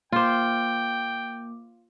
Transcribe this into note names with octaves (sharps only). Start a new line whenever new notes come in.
A#3 F4 C5 G5 D6